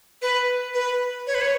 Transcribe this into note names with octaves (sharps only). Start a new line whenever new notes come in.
B4
B4
C#5
B4
C#5